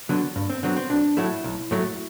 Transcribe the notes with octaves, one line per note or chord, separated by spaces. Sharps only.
D3 F#3 B3
G2
C4
D3 F#3 B3 C4
C4
B1 D4
A2 F#3 A3 E4
B1
A2 F#3 A3